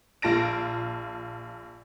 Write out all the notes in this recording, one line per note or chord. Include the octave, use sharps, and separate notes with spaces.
A#1 F4 A5 A#6 D7